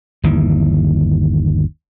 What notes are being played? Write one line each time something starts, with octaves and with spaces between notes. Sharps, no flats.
G1 D#2 E3